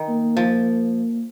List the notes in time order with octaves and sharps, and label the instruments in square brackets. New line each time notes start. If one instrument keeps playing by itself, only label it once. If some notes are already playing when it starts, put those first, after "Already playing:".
Already playing: [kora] D#3
[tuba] A#3
[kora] F3